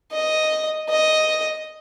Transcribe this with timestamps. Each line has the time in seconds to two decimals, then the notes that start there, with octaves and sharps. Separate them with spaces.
0.12 D#5
0.89 D#5